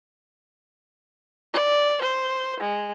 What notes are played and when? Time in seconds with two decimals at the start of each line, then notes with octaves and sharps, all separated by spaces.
1.54 D5
2.01 C5
2.60 G#3